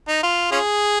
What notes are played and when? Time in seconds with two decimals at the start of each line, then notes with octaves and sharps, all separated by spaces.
0.08 D#4
0.23 F4
0.52 C#4 F4 G#4